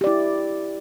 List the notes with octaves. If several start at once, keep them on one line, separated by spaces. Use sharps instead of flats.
E4 G4 D5